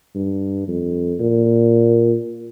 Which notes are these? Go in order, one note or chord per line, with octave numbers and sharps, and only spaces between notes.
G2
F2
A#2